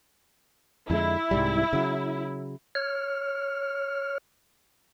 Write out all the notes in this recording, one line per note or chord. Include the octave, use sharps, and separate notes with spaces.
F2 D3 G#3 E4
C2 G#2 G3
C#3 F#3
C#5 F6